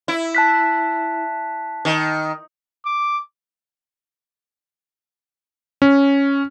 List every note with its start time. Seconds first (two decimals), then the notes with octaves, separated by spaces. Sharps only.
0.08 E4
0.35 A5 F#6 B6
1.85 D#3
2.86 D6
5.82 C#4